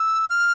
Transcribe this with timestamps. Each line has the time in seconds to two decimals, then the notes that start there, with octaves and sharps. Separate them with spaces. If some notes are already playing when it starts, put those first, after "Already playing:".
Already playing: E6
0.30 F6